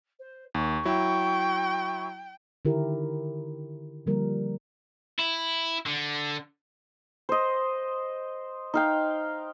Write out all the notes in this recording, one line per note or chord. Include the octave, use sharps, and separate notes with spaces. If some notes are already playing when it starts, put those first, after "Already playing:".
C5
D#2 C#6
F#3 E4 G5
D3 D#3 E4 G4 A#4
D3 F3 G3 A#3 A#4
E4
D3
C5 D#5
D#4 F5 G5